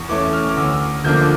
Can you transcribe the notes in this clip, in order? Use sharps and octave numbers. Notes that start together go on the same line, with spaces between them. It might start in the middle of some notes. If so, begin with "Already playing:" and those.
Already playing: E2 C#6
E3 A3 C#4 D6
F6
D6
D2 E6
D3 F3 A#3 D4 G6